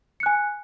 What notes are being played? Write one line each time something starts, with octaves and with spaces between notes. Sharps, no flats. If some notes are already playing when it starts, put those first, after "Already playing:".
G#5 F#6 C#7